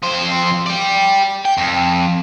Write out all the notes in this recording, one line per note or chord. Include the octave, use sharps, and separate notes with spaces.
F2 C5
D5 G5
G5
F2